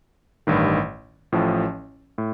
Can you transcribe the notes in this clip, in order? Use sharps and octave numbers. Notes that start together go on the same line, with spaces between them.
A1 G2 D#3
A1 A2 F3
A2